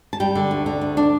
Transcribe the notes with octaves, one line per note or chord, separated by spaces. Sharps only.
A5
G3 G5
D3
D2
D3
D2
D4